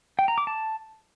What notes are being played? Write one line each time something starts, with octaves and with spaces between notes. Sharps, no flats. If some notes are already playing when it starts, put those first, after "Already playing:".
G5
A#5
D6
A5